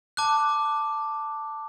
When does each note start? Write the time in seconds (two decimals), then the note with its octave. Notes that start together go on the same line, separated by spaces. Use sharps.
0.17 A5 D6 F#6